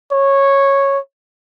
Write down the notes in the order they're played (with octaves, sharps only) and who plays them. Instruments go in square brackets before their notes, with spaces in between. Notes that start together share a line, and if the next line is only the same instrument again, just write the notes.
[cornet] C#5